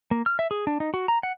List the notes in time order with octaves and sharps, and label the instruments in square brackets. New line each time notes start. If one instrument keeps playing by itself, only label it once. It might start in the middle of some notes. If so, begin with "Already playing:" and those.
[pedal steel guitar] A#3
F6
E5
G#4
D4
D#4
F#4
A#5
F#5